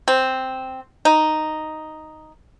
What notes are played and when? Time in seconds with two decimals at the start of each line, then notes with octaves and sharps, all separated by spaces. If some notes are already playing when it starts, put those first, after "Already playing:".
0.08 C4
1.05 D#4